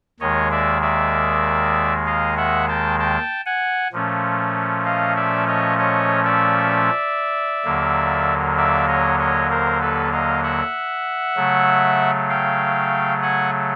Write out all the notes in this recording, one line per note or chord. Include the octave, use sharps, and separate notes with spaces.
D#2 D#3 G#3 C#5 D#5
D5 E5
D5 E5
D#5 F5
E5 F#5
G5 A5
G5 A5
F#5 G#5
A#2 F3 A3 C#4
D#5 F5
D5 E5
C#5 D#5
C#5 D#5
D5 E5
D#2 D3 F#3 A#3
D5 E5
C#5 D#5
C#5 D#5
A#4 C5
A4 B4
D#5 F5
E5 F#5
C#3 F#3 A3
F5 G5
F#5 G#5